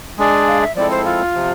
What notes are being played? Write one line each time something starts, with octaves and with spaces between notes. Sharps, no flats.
G#3 D4 G#4 D5 G#5
F5
E5
F3 G#3 C4 E4 A4 D5
C5
F4
C3 F3